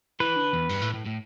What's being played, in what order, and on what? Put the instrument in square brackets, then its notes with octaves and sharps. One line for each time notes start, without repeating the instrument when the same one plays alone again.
[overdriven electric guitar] E3 [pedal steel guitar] B4
[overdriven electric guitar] D3
E2
G2
A2
A2
A2